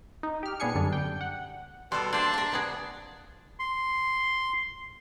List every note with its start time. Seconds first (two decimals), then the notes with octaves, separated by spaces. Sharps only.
0.23 D#4
0.43 G4 F6
0.60 A#2 B3 D4 G#4 G#5 C#7
0.75 F#2 D3 G3 D4
0.93 G5
1.21 F#5
1.92 B2 G3 A4 C6
2.13 A#3 D4 C5 E5 C6
2.33 A#4 A5
2.52 C3 B3 G#4
3.59 C6